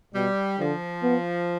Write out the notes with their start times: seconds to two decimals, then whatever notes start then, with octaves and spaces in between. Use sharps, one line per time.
0.15 B2 G3
0.59 D3 F3
1.03 B3